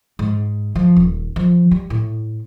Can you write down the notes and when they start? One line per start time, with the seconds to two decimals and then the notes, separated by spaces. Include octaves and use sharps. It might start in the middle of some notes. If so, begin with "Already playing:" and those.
0.19 G#2
0.75 F3
0.96 D#1
1.36 F3
1.71 G3
1.90 A2